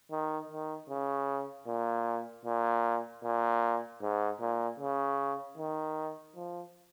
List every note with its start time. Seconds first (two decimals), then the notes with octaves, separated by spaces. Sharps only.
0.11 D#3
0.50 D#3
0.89 C#3
1.67 A#2
2.45 A#2
3.24 A#2
4.02 G#2
4.40 A#2
4.79 C#3
5.57 D#3
6.36 F3